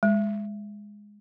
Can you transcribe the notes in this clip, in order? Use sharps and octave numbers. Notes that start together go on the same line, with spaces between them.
G#3